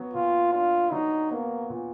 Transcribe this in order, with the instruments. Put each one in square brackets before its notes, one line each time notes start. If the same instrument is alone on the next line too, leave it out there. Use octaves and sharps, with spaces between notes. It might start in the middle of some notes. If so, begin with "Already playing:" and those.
Already playing: [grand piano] F#3 B3
[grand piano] A#2 [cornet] F4
[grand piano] D4 [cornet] F4
[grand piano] F#3 [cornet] D#4
[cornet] A#3 [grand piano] B3
[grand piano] A#2